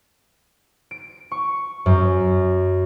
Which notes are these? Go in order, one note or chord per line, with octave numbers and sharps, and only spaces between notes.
D7
C#6
F#2